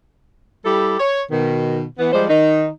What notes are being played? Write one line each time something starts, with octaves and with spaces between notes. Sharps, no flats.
G3 E4 G4 A4
C#5
B2 D#3
E3 B3
F3 G3 G#3 C5
D#3 D#4